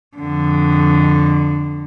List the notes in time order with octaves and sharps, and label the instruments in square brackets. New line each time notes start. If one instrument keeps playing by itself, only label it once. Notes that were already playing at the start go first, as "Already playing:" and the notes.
[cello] F2 D3